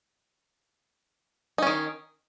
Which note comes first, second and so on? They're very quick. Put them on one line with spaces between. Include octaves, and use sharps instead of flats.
D#4 C#4 D#3